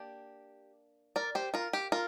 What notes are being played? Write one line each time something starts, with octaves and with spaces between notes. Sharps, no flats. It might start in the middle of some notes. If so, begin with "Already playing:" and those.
Already playing: A#3 D4 G4
A#4 D5
G4 C5
F4 A#4
G4
F4 A#4